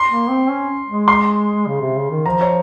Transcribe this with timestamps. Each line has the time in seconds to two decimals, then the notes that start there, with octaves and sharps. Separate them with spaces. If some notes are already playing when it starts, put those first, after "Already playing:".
Already playing: C6
0.10 A#3
0.30 C4
0.49 C#4
0.88 G#3
1.08 C6
1.67 C#3
1.81 C3
1.97 C#3
2.11 D#3
2.26 F3 A#5
2.41 C#5